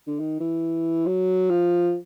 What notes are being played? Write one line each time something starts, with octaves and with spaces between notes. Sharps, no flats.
D3
D#3
E3
F#3
F3